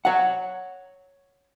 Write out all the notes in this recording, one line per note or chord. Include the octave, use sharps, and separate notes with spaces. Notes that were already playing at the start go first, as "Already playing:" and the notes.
C#5 F#5